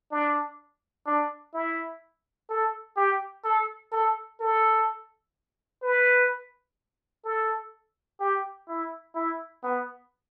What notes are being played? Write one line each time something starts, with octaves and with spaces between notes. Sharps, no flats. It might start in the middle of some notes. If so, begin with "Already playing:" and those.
D4
D4
E4
A4
G4
A4
A4
A4
B4
A4
G4
E4
E4
B3